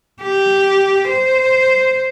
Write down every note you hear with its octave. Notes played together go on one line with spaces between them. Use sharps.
G4
C5